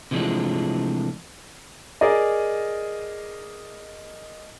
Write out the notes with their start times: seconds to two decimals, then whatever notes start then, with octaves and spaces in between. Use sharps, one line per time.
0.11 C3 E3 F3 G#3 A3 D4
2.01 G#4 A#4 D5 D#5